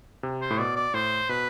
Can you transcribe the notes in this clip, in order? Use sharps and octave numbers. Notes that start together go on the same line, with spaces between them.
C3
C5
A2
B2 D5
D5
A2 C5
B2 B4